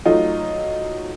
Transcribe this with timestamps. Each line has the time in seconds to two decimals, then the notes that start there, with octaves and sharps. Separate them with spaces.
0.05 F#3 A3 D#4 F4